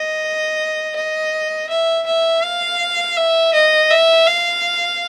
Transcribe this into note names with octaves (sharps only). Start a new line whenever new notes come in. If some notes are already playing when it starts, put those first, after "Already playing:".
Already playing: D#5
D#5
E5
E5
F5
E5
D#5
E5
F5